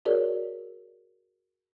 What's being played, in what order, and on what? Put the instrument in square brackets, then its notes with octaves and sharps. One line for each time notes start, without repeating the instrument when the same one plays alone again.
[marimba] F#4 G#4 A#4 C#5 D5